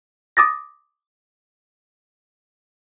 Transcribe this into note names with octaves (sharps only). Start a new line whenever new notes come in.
D6 D#6 A6 A#6